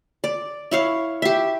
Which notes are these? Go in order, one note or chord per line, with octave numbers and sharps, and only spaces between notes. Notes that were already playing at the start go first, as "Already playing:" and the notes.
D5
E4 C#5 F5
G4 E5